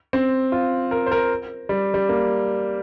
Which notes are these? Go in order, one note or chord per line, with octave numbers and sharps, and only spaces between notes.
C4
F4
A#4
C5
A#4
G3
G3
A#3